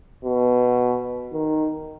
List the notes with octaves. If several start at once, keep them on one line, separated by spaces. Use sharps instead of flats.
B2
D#3